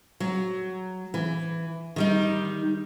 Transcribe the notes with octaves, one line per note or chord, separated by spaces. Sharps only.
F#3
E3
D#3 G3 D#4